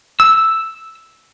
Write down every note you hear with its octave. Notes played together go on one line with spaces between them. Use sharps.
E6